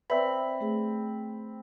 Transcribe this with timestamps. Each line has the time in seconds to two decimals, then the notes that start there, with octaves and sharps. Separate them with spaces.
0.10 C4 B4 D5 E5 B5
0.61 A3 G#4